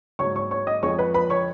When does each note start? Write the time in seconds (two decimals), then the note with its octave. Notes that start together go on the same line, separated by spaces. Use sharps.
0.19 G#2 F#3 C#5 C#6
0.35 C#5 C#6
0.51 C#5 C#6
0.67 D#5 D#6
0.83 F2 F3 G#3 C#5 C#6
0.99 B4 B5
1.14 B4 B5
1.30 C#5 C#6